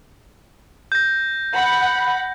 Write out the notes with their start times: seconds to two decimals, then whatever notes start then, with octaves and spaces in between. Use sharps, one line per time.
0.92 G6 A#6
1.53 F#5 B5